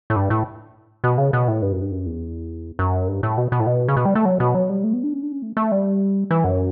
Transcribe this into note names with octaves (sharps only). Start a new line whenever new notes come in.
A2
G2
A2
B2
C#3
B2
A2
G2
F#2
G2
F#2
E2
F#2
G2
A2
B2
B2
A2
B2
C#3
B2
G3
A3
F#3
B2
F#3
G3
A3
B3
D4
C#4
D4
C#4
A3
A3
G3
E3
F#2